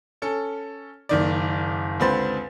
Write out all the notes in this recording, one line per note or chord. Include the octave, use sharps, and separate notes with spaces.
C#4 A4
F#1 D#3 D5
C#2 D3 C4 B4 C6 A6